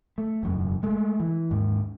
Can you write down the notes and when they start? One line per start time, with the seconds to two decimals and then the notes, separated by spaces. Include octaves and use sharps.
0.18 A3
0.43 E1 F#2 C#3
0.83 G#3 A3
1.20 E3
1.51 D#2 G#2